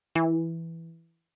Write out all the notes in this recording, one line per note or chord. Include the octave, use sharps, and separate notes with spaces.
E3